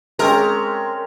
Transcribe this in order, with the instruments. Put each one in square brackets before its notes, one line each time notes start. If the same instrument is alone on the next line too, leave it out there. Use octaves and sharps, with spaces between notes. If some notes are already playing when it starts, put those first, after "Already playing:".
[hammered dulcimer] G#3 C4 C#4 [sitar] A#4